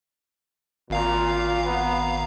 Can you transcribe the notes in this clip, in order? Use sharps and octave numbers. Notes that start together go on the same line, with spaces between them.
G#1 A#2 F5 A#5
B3